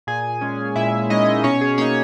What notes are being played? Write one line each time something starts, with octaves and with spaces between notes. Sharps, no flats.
A#2 G#4 G#5
G#3 C#4
A#2 E4 E5
G#3 C#4 D#4 D#5
B2 C#4 C#5
G#4
A#3 C#4 D#4 C#5